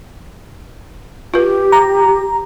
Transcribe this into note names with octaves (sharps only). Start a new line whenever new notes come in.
F4 G4 B4
A#5